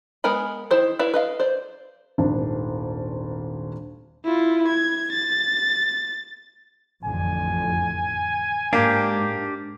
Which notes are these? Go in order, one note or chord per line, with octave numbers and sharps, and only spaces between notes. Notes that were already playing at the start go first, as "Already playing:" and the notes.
G#3 B3 A#4 G#5 B5
D#3 E4 C5
E4 B4 D5 F5
B4 D#5 F5
C5 D5
D#1 G#1 D4
E4 F4
G#6
A6
A1 F2 D3 G#5
G#2 A#3 D4 G4